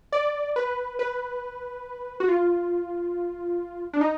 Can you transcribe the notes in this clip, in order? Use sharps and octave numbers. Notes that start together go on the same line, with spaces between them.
D5
B4
B4
F#4
F4
D4
D#4